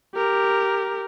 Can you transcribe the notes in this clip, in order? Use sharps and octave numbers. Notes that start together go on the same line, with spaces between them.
G4 A#4